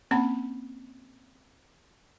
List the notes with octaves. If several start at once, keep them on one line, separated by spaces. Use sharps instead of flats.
A#3 C4 C#4 F#5 B5